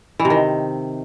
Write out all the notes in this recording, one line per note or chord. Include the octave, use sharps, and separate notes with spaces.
E3
C3
D#3